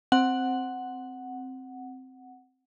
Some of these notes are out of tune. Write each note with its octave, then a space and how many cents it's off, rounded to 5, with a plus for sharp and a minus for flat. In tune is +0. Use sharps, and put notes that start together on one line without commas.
C4 +0 F#5 +0